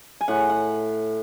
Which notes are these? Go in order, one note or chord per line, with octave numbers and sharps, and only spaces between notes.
G#5
A2 F#5
F#5